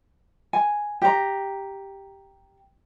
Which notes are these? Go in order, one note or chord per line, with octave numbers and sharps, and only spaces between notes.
G#5
G4 A#5